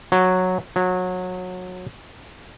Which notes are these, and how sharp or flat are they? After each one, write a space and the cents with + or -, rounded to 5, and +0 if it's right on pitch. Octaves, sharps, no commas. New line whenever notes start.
F#3 -10
F#3 -25